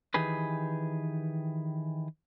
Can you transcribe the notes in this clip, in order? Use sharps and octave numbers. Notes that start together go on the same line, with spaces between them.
D#3 E3 G4 G#4 B4